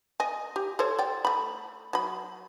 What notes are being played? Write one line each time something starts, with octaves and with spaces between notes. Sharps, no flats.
D#5 G#5
G4
A4 C5 C#5
D5 G5
A3 B5
F#3 B5